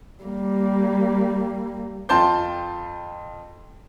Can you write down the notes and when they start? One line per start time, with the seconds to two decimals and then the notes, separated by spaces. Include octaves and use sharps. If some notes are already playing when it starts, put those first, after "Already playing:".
0.24 G3 A#3
2.09 F2 F4 G5 A5 C6 G6